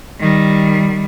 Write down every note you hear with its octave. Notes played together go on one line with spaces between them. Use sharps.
D#3 G3